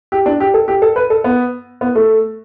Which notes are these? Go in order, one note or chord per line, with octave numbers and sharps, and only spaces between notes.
G4
D4
G4
A4
G4
A4
B4
A4
B3
B3
A3